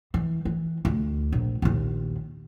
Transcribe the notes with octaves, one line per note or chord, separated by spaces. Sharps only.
E3
E3
D2
A#1
A#1 D#2